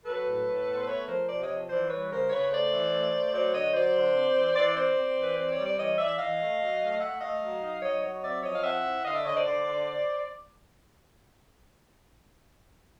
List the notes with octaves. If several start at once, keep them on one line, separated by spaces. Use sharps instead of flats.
F#3 A4 B4
A2
A2
B3
C5
A3 B4 C#5
F3 A#4 C5
C3 C5 D5
C#5 D#5
F3
E3 C5 D5
G3 B4 C#5
C#3 A#4 C5
C#3 B4 C#5
A3 C5 D5
E3
A3
A3
F#3 C5 D5
D3 C#5 D#5
F#3 C5 D5
D3
C4
E3
E3 C5 D5
C4 C5 D5
C4
E3
B4
C4 C5
C#5
G3
D5
E3 C#5 D#5
E3 D5 E5
E3 D#5 F5
A3
F#3
A3
A3 E5 F#5
A3 D#5 F5
F#3
D#4
F#3 C#5 D#5
F#3 C#5 D#5
C4 D5 E5
F3 C#5 D#5
F5
C4 E5 F#5
E4
D3 D#5 F5
D5 E5
D3 C#5 D#5
C5 D5
D3 C5 D5
D3